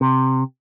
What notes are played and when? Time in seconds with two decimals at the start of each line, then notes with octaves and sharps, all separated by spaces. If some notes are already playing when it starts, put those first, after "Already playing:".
0.01 C3